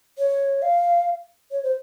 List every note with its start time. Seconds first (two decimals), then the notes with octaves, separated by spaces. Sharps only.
0.18 C#5
0.62 F5
1.51 C#5
1.63 C5